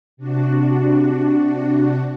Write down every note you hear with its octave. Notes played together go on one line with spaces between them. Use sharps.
C3 D4 F#4